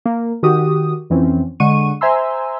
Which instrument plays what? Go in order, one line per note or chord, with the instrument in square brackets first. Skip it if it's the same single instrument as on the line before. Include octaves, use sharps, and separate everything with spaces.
[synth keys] A#3
D#3 F#4 G4 D#6
F2 E3 C4 C#4
D3 G#3 F#5 C#6 D#7
C5 E5 G#5 A#5 C6 E6